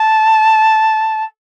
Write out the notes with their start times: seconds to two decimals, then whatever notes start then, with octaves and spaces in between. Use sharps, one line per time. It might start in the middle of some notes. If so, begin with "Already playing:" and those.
Already playing: A5